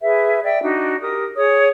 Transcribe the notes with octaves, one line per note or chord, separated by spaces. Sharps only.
G#4 B4 E5
D5 E5 G5
D4 D#4 F#4
G4 A#4 D#6
G#4 C#5 D#6